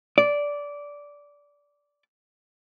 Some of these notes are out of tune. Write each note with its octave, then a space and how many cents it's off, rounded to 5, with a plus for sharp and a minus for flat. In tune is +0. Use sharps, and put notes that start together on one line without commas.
D5 -15